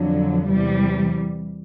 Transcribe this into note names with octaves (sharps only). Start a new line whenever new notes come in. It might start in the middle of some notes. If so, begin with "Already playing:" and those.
Already playing: F2 D3 F#3
E2 C3 E3 G3